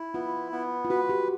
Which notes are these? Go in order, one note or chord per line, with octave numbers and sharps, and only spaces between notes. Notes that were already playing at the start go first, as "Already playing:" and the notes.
Already playing: E4
B3 F4
B3
F4
F#4 B4
G4